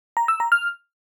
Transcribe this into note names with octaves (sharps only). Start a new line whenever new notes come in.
A#5
E6
A#5
F6